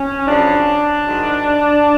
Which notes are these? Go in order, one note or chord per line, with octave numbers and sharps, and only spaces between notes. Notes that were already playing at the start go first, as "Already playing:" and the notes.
Already playing: C#4
F#2 C#3 F3 D4
G#2 D#3 F#3